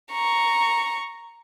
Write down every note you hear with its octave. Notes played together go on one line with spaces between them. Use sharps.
A#5 C#6